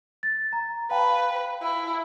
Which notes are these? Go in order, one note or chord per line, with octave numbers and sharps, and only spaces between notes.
A6
A#5
B4 F5 G5 A5
E4